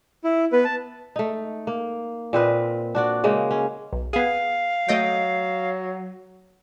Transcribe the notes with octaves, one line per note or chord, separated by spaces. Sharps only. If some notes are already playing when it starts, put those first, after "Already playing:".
E4
B3 B4
A5
A3 D#4
A#3
A#2 C4 B4 D#5
D4 F#4 D5
C#3 G#3 A#3
C#4
B1
B3 G#4 F5
F#3 A3 D#5 G5